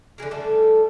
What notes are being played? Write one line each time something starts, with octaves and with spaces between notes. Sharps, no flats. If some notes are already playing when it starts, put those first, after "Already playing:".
D3 E3 G#4 A#4
G3 A3 A4